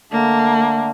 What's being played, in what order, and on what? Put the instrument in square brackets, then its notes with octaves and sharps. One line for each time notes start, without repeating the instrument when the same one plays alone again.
[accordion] D3 A3 D4 [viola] A#3